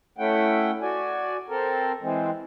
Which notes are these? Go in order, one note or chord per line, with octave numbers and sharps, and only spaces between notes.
A3 C#4 E4 F#5 G5
F#4 D5 G#5
C4 A4 A#4
E3 G#3 C4